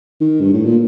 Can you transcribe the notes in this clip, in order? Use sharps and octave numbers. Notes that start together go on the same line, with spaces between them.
D#3
G2
A2
A#2